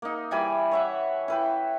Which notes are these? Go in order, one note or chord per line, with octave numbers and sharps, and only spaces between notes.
A#3 D#4
E3 G3 G#5 B5
C#5 E5 F#5
E4 B4 G5